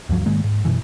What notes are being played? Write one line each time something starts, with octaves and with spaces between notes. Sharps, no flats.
D2 G2 F3 F#3
G#2 D#3 G#3 A#3
G#2
F#2 B2 E3